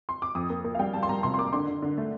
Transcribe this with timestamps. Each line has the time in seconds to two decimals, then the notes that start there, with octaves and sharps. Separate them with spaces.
0.09 C6
0.22 D6
0.35 F2 D#6
0.50 A#3
0.65 A#3
0.75 F5
0.79 G3 G5
0.93 G3 A5
1.03 C6
1.09 G3 A#5
1.23 C3 C6
1.34 C6
1.38 A#3 D6
1.53 D3 C6
1.67 D3
1.82 D3
1.98 A3